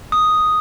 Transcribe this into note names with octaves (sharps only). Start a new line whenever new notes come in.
D#6